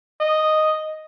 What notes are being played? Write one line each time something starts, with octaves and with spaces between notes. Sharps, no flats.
D#5